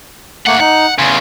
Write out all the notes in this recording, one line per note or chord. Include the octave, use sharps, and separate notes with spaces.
G2 A3 A#3 F#5
D#4 F#5
E2 C#3 G#5 C6